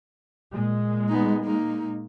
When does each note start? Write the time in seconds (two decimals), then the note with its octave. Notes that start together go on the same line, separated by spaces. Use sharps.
0.53 A#2 G#3
1.09 B3 D#4
1.44 A#3 D#4